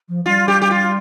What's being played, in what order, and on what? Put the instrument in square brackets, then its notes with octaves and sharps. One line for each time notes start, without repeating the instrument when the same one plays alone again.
[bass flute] F3
[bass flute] G3 [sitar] F4
[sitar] G4
G4
F4